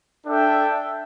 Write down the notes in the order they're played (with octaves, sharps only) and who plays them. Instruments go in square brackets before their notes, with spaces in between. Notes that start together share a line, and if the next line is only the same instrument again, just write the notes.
[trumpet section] D4 A4 E5 G5